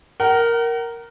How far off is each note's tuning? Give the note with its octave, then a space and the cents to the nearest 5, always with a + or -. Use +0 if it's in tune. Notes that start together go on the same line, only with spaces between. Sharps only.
A#4 +0 F#5 +40